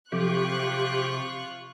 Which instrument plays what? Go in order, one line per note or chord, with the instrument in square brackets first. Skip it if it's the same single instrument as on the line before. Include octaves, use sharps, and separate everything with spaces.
[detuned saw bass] C3 [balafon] F3 F#3 A4 [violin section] F4 C#6 F#6 [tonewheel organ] G4